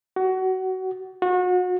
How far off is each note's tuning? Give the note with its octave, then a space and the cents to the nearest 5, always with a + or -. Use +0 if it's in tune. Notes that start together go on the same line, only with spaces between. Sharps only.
F#4 +25
F#4 -30